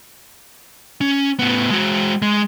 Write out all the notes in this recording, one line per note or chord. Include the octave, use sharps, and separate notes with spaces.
C#4
A2 B3
G#3 F#4
G#3